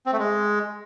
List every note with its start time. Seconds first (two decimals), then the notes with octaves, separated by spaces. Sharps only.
0.06 C4
0.13 A3
0.19 G#3